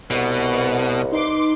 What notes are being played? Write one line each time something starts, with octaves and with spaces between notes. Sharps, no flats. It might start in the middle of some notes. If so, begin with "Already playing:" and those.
C2 B2 B4 D#5 F#5
D#4 B4 C6 D6